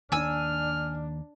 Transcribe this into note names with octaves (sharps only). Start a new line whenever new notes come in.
D#2 D4 G#5 E6 F6